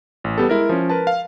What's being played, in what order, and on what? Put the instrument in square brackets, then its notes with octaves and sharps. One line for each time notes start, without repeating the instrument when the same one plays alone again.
[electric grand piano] A1
G3 B3 G4 A4
G#3 E4 A#4
F3 C#4
A#4 B4 A5
F5